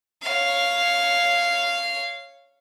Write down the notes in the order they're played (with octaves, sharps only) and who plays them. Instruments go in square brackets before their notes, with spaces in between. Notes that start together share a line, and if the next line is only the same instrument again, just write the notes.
[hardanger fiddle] C#5 F5